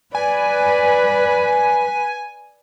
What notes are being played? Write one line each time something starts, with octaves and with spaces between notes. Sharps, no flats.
B4 D5 G#5